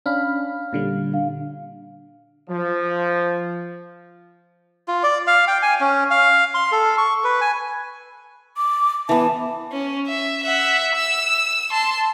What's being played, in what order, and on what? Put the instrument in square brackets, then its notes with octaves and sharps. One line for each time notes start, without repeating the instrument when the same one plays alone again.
[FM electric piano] C#4 D4 B5 [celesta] F5 F6
[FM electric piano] A#2 D3 G3
[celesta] D4 F5
[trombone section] F3
[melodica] F4
D5
F5
G5
G#5
C#4
F5
C6
A4
C#6
B4
G#5
[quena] D6
[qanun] E3 B3 [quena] A5
[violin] C#4
E5
E5 F#5
E6
A5 C6